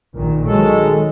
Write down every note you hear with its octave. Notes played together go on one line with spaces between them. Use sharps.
A#1 A#2 D#3
D#3 F#3 G#3 A4